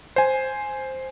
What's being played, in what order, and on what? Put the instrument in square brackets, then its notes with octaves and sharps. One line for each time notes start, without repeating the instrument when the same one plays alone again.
[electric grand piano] C5 G#5